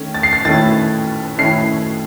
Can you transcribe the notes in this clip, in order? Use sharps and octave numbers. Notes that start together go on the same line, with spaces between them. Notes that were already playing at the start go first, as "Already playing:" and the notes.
Already playing: D#3 A3 C#4
A6
C7
A6
D#3 A3 C#4 E4 A6
D#3 A3 C#4 E4 C7